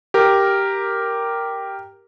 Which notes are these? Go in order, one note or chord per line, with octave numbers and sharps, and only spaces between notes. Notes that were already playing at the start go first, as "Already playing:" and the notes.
G4 A#4